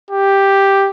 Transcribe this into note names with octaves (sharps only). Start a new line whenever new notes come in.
G4